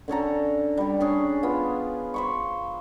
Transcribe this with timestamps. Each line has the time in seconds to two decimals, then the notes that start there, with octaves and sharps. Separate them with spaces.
0.08 D3 C#4 A4 A#5
0.77 G3 G4
1.01 C#4 D4 G#4
1.43 B3 F4
2.14 C5 B5 C#6